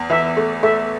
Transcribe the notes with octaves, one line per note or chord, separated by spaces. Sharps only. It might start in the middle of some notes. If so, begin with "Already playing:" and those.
Already playing: E2
E3 E5
A3
A3 E5